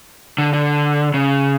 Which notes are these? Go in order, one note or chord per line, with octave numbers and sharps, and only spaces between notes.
D3
D3
C#3